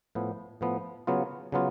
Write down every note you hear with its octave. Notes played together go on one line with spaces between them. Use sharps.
A2 F3 B3
A2 F3 B3
C#3 F#3 B3 F4
C#3 F#3 B3 F4